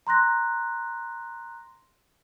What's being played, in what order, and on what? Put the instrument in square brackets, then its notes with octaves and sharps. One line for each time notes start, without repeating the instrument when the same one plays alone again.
[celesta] A#5 C6 F#6 A#6